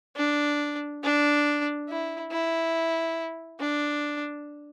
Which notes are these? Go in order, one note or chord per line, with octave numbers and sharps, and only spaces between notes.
D4
D4
E4
E4
D4